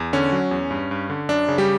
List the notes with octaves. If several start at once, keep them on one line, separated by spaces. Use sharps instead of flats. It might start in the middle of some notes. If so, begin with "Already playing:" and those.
Already playing: E2
D3 C#4
F#3
E2
G2
G2
D3
F#2 D4
C#3
G3 G4